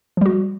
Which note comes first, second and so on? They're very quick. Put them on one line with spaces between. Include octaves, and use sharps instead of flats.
F3 G3 F#4